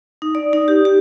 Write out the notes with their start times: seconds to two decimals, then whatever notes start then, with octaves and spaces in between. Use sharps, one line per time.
0.22 D#4
0.35 D5
0.53 D#4
0.68 G4
0.85 G4